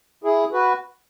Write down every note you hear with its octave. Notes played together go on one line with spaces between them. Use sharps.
E4 G#4
F#4 B4